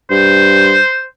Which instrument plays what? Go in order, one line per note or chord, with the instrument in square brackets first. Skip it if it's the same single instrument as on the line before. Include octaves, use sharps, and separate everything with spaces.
[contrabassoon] G2 [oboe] C5